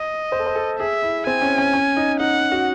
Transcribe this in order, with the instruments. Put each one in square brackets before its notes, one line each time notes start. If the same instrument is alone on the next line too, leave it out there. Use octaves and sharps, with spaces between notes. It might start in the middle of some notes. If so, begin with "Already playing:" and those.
Already playing: [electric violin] D#5
[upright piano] C5
A4
C5
A4
[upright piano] G#4 [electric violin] E5
[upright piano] E4
[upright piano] C4 [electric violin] G#5
[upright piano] C#4
C#4
C#4
D#4
[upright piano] D#4 [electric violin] F#5
[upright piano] F#4